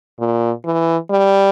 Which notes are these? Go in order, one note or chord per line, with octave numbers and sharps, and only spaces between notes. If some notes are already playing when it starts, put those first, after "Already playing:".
A#2
E3
G3